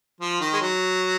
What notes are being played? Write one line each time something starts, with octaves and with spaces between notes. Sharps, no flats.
F3
D#3
G#3
F#3